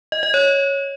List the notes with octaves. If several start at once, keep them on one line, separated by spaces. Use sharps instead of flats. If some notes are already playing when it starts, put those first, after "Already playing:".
D#5
D#5
C#5